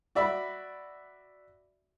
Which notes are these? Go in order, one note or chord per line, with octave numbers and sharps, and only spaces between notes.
F#4 D5 E5 B5